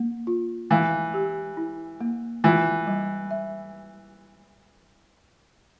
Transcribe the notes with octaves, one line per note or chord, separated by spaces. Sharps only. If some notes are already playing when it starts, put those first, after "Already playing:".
Already playing: A#3
F4
E3 F5
G4
E4
A#3
E3 F4
G3
E5